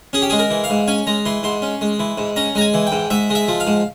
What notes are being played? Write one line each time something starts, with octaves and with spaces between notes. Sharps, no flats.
C#4 G#4
G4
G#3 G#4
A#4
E3
F5
G#2
C#4 G#5
G#3 A#5
E3 C6
G#2 C6
C#4
G#3
E3
G#2
C#4 A#5
G#3 A#5
G#5
E3
G5
G#2
G#2 E5
G#3
E5
F3
F5
G#2